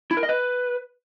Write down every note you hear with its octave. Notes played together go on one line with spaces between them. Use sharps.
E4
A#4
D#5
B4